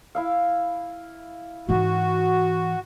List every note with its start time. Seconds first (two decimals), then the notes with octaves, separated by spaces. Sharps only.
0.15 E4 E5 F5
1.69 G#2 E3 F#4